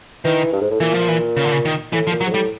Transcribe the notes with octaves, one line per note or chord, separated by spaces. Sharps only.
D#3 E3
G2
G#2
A2
A#2 E3
F3
E3
C#3
D3
C#3
D#3
A2 E3
F3
A#2
F#3
G#2
A2 G3